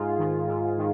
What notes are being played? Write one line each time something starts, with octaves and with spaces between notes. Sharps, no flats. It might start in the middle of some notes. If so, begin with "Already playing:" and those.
Already playing: G#2 F4 G#4
D#3
G#2
D#3